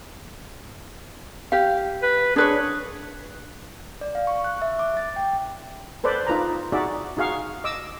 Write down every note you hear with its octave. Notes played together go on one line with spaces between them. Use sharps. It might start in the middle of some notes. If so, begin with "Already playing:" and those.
G4 F5
B4
D4 G#4 B4 C#5
D5
F5
C#6
F#6
E5
D6
A6
G5
A4 B4 C5 D5
D#4 F4 B4 A#5
D#4 F#4 G#4 D5 E5
D#4 F#4 G#4 F5 C#6
D#5 D6 E6